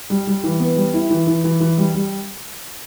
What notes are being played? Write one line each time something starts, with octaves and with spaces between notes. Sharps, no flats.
G3
G3
E3
B3
G3
E4
E3
E3
E3
E3
G3
G3